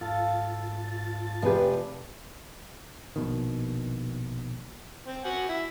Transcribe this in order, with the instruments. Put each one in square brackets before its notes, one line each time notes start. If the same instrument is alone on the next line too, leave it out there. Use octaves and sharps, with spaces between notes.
[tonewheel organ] G#2 F4 A6 [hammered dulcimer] A4 F5
[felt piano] F1 G4 [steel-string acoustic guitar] F3 G#4 B4
[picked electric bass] A#1 B2 D#3
[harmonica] C4
F#4 F#5 G#5
E4